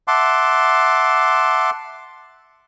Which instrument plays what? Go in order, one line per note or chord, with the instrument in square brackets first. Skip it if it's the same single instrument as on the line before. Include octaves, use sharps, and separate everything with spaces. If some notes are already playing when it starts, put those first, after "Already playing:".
[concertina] E5 F#5 A5 C6 D6